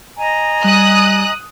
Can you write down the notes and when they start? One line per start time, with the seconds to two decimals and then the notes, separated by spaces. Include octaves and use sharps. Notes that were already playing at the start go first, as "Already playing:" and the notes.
0.17 D#5 G#5 A#5
0.64 G3 D#6 F#6